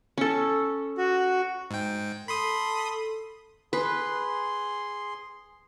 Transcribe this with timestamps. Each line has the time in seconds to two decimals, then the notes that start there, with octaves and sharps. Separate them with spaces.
0.18 C#4 A4
0.98 F#4
1.71 G#2 G5
2.28 A4 B5 C6 D#6
3.73 G#4 B4 C6